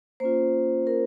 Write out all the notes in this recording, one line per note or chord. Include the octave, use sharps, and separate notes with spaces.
A#3 C#4 F4 C5
A#4